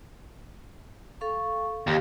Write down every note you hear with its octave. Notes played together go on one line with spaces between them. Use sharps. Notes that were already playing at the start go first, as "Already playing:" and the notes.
A4 F5 C#6
D#2 G4 F5